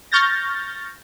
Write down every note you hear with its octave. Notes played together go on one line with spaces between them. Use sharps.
C#6 F6 G6 A6 A#6